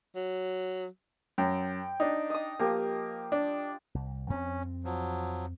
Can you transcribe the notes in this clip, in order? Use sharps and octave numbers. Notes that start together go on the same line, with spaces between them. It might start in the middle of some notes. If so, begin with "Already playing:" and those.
F#3
F#2 G5
D4 D#4
D#5 D#6
F3 A#3 G4
D4
C2
F2 A#3 C4 C#4
F3 F#3